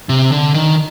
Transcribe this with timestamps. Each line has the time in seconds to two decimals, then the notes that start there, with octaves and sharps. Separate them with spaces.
0.09 C3
0.32 D3
0.54 D#3